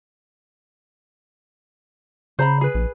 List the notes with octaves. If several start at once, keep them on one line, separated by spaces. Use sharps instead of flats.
C#3 C5 A#5 B5
G#4 B4
A#1